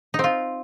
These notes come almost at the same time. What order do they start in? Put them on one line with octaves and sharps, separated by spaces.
D#4 C4 F4